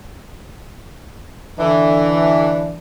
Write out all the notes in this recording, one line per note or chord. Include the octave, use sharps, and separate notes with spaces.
D3 E3 D4